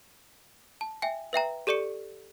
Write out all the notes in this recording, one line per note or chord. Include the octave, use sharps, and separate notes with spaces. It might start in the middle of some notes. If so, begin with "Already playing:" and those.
A5
E5 G5 G#5
B4 E5 G5 A#5
G4 A4 D5 C#6 C#7